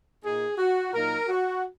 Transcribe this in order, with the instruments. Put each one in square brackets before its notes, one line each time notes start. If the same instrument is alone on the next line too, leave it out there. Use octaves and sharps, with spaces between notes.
[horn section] A#2 A#3 D#4 G#4
F#4
A#2 F#3 A#3 D#4 A#4
F#4